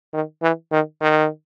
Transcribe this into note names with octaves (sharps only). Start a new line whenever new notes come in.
D#3
E3
D#3
D#3